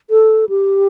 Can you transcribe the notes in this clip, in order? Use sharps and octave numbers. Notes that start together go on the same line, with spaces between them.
A4
G4